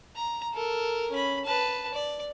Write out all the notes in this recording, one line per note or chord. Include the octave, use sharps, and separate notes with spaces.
A#5
A4 A#4
C#4 B5
B4 A5
D5